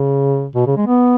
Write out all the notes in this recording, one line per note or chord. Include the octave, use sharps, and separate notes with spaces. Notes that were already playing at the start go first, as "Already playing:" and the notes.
Already playing: C#3
B2
C#3
G#3
B3